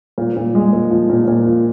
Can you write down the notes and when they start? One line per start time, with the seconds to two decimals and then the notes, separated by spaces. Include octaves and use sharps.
0.18 A#2
0.37 A#2
0.55 G#3
0.73 A#2
0.91 F3
1.10 A#2
1.28 A#2
1.46 F3